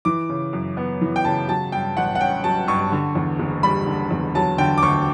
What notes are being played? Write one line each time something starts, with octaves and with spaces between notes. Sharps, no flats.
E3 D6
C#3
F#2
B3
E3
G5
C#3 A5
F#3 A5
G2 G5
A1 F#5
F#5
C#4 G5
F#3 A5
G2 C#6
D3
E2
F#1
G3 B5
D3
E2
F#3 A5
D3 G5
D6
D2 C#6